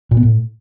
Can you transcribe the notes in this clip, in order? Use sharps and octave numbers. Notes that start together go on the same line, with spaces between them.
A#2
B3
A2